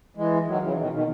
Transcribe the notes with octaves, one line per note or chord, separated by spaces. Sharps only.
E3 G#3
D#3 F#3
C#3 E3
E3
B2 D#3
B2 D#3